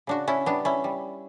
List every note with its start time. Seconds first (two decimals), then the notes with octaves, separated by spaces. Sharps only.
0.07 C#3 D4 F#4
0.28 C#4 E4
0.46 G3 B3 D4
0.65 C#4 E4
0.84 G3